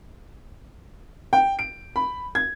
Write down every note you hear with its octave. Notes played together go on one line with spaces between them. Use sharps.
G5
D7
B5
G#6